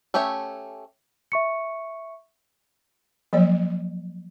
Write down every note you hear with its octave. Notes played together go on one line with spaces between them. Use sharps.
A3 C#4 G4 C#5 E5
E5 C#6 C#7
F3 F#3 A#3 C#5